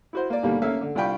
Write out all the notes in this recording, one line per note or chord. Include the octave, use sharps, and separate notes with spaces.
E4 F#4 C5
A#3 D5
D#2 B2 D3 G3 A#3
A3 A#3 C#4 E5 F5
D3
C2 D4 F4 G5 B5 C#6